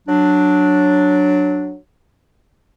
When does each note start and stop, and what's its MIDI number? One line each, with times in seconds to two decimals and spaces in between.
0.08 1.76 54
0.08 1.76 62